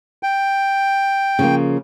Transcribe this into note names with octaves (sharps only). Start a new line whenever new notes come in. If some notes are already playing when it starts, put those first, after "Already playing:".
G5
C#3 F3 A#3